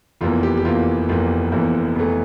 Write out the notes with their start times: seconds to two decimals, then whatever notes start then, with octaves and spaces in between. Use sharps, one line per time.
0.21 F1 E2 E3 A#3 F4
0.43 G4
0.57 G4
0.64 F1 E2 E3 A#3 F4
1.09 F1 E2 E3 A#3 F4
1.52 F1 E2 E3 A#3
1.96 F1 E2 E3 A3